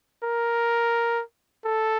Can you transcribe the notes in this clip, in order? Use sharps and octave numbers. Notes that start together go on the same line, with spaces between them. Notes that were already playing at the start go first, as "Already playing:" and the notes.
A#4
A4